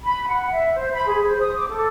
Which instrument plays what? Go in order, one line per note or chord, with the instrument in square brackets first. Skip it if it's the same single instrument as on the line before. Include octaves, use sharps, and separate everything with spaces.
[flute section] B5
F#5
E5
C5
B5
G#4
C5
D#6
D6
A4